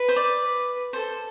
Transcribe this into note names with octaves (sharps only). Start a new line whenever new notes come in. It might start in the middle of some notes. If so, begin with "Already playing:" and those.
Already playing: B4
C5
D5
B4
A4 C5